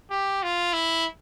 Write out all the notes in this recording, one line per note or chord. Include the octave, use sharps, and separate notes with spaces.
G4
F4
E4